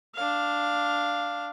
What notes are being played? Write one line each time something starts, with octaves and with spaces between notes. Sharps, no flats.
D4 F5